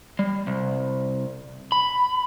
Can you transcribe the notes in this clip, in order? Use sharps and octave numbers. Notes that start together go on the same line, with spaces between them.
G3
C2
B5